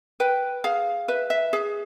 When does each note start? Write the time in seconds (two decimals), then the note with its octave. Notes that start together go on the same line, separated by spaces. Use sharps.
0.20 B4 G5
0.64 G#4 F5
1.08 B4 E5
1.30 E5
1.53 G#4